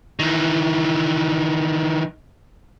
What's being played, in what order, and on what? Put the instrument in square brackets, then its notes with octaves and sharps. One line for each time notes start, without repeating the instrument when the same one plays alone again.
[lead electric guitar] D#3 E3